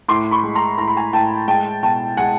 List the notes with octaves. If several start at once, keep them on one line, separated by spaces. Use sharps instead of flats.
A2 C6 D6
B5 C#6
G#3
A#5 C6
A2 A#5
B5
G#5 A#5
A2 G5 A5
G#3 G5 A5
B2 G5 A5
G#3 F#5 G#5